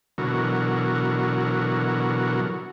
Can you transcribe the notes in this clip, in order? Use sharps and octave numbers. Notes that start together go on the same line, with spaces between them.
B2 D3 E3 F#3 F#4 A#4